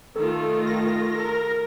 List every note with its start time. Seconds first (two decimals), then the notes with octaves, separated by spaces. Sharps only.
0.16 D#3 A3 F4 A4
0.67 A#6
1.15 A#4